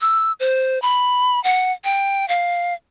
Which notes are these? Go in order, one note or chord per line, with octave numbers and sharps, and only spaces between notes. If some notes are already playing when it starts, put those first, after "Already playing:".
E6
C5
B5
F#5
G5
F5